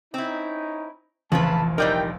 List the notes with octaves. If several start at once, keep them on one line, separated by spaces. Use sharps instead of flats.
C4 C#4 D#4 E4
F1 A#1 F2 C#3 E3 F4 B4 A5
E3 G3 D#4 A#4 D5 G5